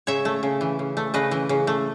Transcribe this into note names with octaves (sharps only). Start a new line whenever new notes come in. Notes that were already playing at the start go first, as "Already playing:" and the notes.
C#3 C#5 E5
A3
C#3
E3
C#3
A3
C#3 B4 D#5
E3
C#3
A3